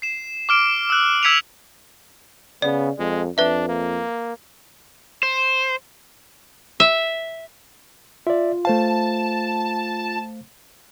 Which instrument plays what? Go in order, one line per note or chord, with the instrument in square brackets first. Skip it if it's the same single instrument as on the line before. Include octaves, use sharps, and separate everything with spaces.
[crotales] C7 E7
D6 F6 D7
E6 F#6
E6 G#6 B6 C#7 D#7 F7
[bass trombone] C#3 [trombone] B3 [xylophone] D5
[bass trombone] F2 [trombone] G#3
[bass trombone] F2 [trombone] D4 [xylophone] B4 E5
[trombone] A#3
[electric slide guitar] C5
[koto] E5
[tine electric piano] F4 [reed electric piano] D5 E5
[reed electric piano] A3 C5 F5 [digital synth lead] A5